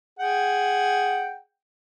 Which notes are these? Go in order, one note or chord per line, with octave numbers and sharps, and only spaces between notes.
G#4 F#5 G5